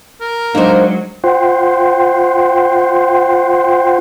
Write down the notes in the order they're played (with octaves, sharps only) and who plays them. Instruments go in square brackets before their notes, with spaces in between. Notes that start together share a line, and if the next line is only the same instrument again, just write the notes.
[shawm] A#4
[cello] F#3 G#3 [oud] A#3 C4 [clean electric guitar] D4 D#4
[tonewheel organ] F4 C5 F#5 G5 C6